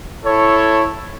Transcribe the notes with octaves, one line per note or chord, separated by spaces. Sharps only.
E4 A4 C#5